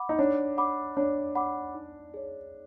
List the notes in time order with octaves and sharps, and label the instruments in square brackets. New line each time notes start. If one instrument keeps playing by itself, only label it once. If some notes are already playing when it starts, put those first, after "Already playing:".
Already playing: [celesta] F#5 B5 D6
[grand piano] D#4
[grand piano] D4 [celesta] C#5
[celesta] F#5 B5 D6
[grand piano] D4 [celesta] C#5
[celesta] F#5 B5 D6
D#4
G#4 C#5